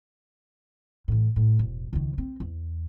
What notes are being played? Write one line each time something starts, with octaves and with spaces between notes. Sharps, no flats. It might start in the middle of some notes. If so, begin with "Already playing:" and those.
A2 E3
A2
E1
C#2 D#3
C4
E2